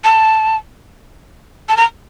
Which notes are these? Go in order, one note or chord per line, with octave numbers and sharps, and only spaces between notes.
A5
A5
A#5